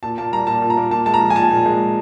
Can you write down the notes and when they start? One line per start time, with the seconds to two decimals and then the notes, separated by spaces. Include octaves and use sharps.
0.03 A#2 A5
0.18 A#3 A5
0.32 G3 A#5
0.47 A#2 A5
0.62 A#2
0.70 A#5
0.77 A#3
0.91 A#2 A5
1.06 G#3 A5
1.14 A#5
1.20 F3
1.30 G#5
1.35 A#2 A5
1.50 A#2
1.66 G#3